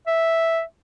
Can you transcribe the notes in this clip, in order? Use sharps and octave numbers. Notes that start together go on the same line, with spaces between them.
E5